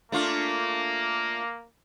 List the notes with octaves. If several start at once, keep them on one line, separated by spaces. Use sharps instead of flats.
A3 A#3 D4 F4